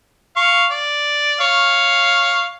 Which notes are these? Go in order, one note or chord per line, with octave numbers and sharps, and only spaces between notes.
F5 C#6
D5
C#5 F5